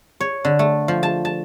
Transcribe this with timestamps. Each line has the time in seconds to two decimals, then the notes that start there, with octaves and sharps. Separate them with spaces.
0.20 C#5
0.45 D3
0.59 A3
0.88 F3
1.03 A5
1.25 A5